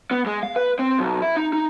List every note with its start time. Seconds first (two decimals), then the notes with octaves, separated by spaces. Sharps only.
0.11 B3
0.26 G#3
0.43 F5
0.56 B4
0.79 C4
0.99 B1
1.22 E4
1.37 D#4
1.53 D#4